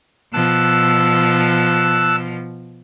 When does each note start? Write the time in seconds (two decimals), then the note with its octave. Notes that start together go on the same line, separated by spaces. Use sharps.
0.33 B2 F3 A5 E6 F#6